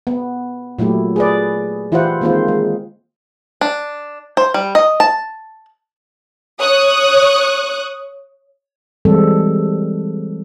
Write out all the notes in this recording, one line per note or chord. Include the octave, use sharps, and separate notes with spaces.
B3
A#2 F#3 A3 E4 G4
G#4 B4 D5
E3 E4 F4 G4 C5 F#5
D#3 G#3 A#3 C4 F4 C5
G#3
D4
C5
G3
D#5
A5
C#5 C#6 D#6 F#6
E3 G3 G#3 C4 A4